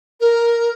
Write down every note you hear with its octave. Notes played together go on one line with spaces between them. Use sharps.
A#4